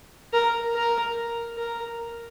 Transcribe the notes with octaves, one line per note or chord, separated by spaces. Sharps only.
A#4
A#4
A#4